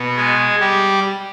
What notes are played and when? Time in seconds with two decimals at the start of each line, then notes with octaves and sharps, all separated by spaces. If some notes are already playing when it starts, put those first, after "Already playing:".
Already playing: B2 B3
0.17 G#3 G#4
0.60 G3 G4